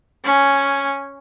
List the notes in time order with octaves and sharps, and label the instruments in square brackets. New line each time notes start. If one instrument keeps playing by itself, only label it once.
[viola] C#4 G#5